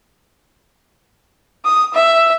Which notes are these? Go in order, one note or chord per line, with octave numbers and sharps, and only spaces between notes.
D#6
E5